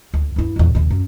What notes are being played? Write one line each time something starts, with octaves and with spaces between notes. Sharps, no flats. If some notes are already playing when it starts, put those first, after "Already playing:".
D2
G2 E4
E2 A#2
D#2 C3
F#2